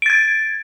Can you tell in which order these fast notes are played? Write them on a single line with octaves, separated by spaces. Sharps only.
D7 A6 G#6